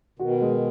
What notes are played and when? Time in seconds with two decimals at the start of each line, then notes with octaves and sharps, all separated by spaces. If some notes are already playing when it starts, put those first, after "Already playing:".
0.19 B2 D#3 F#4
0.42 G#3